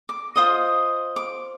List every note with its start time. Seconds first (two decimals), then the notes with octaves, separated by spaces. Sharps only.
0.09 D6
0.36 F4 C5 D#5 D#6
1.16 D6